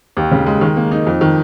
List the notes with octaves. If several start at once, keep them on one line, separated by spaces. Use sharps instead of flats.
D#2
C#3
G#3
D#3
A#3
D#4
F2
D#3